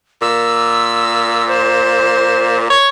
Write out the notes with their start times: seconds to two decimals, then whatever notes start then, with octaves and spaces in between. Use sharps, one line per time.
0.22 A#2 E6
1.48 C5
2.70 C#5